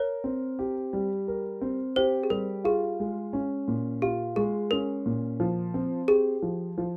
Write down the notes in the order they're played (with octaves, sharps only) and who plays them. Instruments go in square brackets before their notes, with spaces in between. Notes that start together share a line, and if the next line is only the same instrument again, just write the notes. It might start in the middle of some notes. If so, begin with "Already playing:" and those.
Already playing: [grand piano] A#4 [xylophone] C#5
[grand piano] C4
G4
G3
A#4
C4
[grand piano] G4 [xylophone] C5
[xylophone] G#4
[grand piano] G3 [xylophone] A#4
[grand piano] F4 [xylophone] G#4
[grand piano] G#3
C#4
A#2
[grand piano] F4 [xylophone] G4
[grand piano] G#3 [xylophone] G#4
[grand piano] C#4 [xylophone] A#4
[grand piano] A#2
F3
C4
[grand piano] G4 [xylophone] G#4
[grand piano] F3
F3